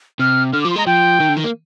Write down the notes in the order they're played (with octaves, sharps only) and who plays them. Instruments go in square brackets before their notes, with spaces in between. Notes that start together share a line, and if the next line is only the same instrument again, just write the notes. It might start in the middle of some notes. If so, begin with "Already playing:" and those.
[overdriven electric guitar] C3 [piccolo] F6
[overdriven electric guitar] D3 [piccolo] F6
[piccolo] D6
[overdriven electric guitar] F3
[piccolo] C6
[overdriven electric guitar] G#3 [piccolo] A#5
[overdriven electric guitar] F3 [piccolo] G5
[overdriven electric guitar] D#3
D3
D#3
A#3